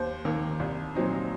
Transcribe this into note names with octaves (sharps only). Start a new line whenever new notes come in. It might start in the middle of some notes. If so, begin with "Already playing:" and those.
Already playing: D#2 C5
D#3 A#3
C2
A#2 F#3 C4 D#4